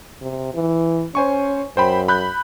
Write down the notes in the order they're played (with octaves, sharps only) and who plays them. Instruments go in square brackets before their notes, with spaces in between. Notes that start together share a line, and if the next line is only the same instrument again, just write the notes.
[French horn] C3
E3
[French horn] C#4 [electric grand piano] C5 G#5 C#6
[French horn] F#2 [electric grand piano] C5 G5 B5
[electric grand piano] B5 F#6 G6